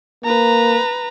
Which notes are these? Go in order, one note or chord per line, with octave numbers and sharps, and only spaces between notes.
A#3 B4 A#5